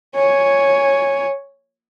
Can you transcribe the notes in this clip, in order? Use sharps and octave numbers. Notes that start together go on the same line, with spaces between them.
C#5 G#5